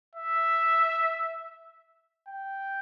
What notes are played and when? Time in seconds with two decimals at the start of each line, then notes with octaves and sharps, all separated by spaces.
0.15 E5
2.28 G5